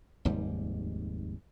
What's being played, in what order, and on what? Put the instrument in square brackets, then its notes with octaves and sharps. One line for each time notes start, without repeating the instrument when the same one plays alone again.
[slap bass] F1 D#2 G#2 G3